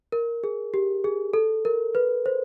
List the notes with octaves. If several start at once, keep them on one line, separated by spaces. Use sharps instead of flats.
A#4
G#4
G4
G#4
A4
A#4
B4
C5